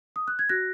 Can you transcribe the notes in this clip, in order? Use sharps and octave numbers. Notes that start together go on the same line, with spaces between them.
D#6
F#6
G#6
F#4 F#6 A#6